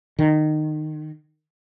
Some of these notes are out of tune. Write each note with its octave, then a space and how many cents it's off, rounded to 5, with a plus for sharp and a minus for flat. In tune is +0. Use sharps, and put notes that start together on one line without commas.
D#3 -20